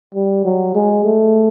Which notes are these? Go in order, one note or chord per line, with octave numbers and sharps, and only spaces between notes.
G3
F#3
G#3
A3